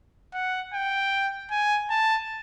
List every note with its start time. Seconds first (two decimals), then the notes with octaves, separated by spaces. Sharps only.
0.34 F#5
0.74 G5
1.51 G#5
1.90 A5